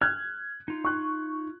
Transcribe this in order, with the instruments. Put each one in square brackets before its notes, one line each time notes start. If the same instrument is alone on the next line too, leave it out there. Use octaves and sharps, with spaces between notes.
[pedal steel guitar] F6 [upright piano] F#6 G#6
[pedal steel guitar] D#4 F4
[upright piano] C#6 F#6